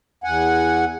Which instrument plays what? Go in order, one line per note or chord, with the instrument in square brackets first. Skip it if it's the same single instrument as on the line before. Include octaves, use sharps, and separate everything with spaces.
[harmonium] E2 F#5 G#5